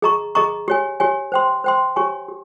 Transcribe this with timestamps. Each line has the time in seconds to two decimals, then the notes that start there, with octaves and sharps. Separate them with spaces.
0.02 G#4 D#5 A#5 C#6
0.35 G#4 D#5 A#5 C#6
0.68 G4 C#5 G#5
1.00 G4 C#5 G#5
1.32 C5 G5 C6
1.64 C5 G5 C6
1.96 G4 C#5 G#5 C#6
2.28 G4